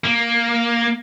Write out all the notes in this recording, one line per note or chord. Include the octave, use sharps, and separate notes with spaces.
A#3